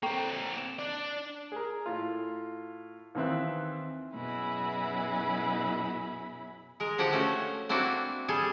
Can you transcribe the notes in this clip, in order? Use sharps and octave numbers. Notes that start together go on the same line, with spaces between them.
A#3 C4 A4 G5 C#6
D7 E7
D4 D5
G#4 A#4
A2 F4
D#2 D#3 E3 C4 E5 F#6
F#2 B2 E4 G#4 B5
G#3 A#4
D3 F3 G4 F#5
A3 C#4 F#4
A#3 C4 D4 E4 F#4
G3 G#4 A4